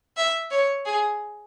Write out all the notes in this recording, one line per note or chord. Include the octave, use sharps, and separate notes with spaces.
E5
C#5
G#4